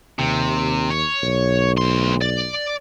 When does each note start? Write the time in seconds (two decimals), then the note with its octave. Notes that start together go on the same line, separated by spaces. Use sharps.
0.19 D#2 C3
0.90 C#5
1.23 B1
1.77 D2 C6
2.22 D5